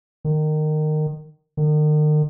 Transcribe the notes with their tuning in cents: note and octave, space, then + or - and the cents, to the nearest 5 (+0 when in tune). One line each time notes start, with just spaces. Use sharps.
D#3 -20
D#3 -40